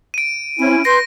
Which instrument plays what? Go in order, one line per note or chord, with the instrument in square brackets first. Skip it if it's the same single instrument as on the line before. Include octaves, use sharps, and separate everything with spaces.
[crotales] D7 D#7
[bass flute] C4 [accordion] C#4 E4
[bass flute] B4 [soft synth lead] C6 [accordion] G6 [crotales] A#6